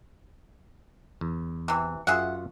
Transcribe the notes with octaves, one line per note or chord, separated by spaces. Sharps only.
E2
C3 E3
F#2 F4 G#4 E5 F#5